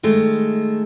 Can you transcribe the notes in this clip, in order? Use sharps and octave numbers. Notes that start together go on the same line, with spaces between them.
D#3 G#3 A3